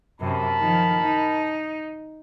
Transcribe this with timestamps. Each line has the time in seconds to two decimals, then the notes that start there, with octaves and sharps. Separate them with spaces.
0.20 F#2 C3 A#4 A5 B5
0.60 D#3 F3
1.02 D#4